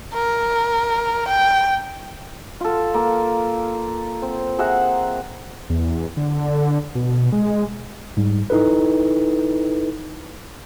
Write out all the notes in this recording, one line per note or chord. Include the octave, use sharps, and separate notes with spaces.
A#4
G5
F4 A4
A#3 A4
C4
G#4 E5 F#5 A#5
E2
D3
B2
G#3
G#2 G3
D#4 E4 A4 B4